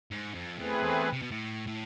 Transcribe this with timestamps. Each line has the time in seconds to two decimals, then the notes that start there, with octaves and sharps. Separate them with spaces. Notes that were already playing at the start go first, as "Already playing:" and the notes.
0.11 G#2
0.35 F2
0.58 E2 A3 C4 G#4 B4
0.83 E2
1.13 C3
1.22 B2
1.31 A2
1.67 A2